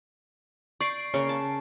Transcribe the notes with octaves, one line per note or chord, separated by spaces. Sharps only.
D5 C#6 C7 D7
C#3 A#3 C#5
A5